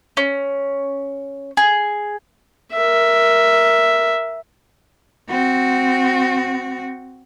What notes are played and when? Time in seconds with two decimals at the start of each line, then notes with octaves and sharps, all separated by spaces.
0.17 C#4
1.57 G#4
2.73 A#4 E5
5.30 C4 F#4